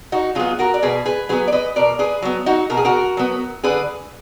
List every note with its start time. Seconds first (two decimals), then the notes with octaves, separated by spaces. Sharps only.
0.12 D#4 F#4
0.35 F#3 B3 F4 G#4
0.59 F#4 A#4
0.74 D5
0.82 B2 G#4 B4
1.06 G#4 B4
1.29 F#3 B3 G#4 B4
1.48 D5
1.52 B4 D#5
1.76 B2 A#4 D5
1.99 G#4 B4
2.22 F#3 B3
2.46 D#4 F#4
2.70 B2 A#4
2.77 G#4
2.85 F#4 A#4
3.17 F#3 B3
3.63 D3 G#4 B4